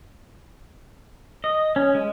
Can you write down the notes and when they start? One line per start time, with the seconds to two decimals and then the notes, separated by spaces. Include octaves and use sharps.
1.44 D#5
1.76 C#4
1.95 G#3